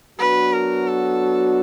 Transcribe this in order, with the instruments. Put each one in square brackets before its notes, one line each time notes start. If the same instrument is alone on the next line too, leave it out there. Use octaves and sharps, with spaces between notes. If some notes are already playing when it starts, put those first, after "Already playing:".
[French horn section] F#3 B3 D4 F#4 [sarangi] B4
[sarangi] A#4
A4